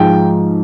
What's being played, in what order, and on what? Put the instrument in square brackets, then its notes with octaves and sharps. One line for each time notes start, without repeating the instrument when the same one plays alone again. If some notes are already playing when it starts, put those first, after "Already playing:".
Already playing: [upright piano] G#2 F3 G#3 [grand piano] G5